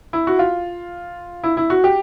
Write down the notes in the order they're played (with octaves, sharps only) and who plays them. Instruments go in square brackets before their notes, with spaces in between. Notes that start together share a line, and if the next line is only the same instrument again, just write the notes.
[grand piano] E4
F#4
F4
E4
E4
F#4
G4